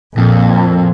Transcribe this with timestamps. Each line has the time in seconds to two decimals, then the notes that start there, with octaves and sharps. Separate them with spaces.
0.18 F2 A#2